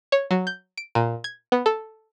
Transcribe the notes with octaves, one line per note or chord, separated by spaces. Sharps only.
C#5
F#3
G6
D7
A#2
G#6
B3
A4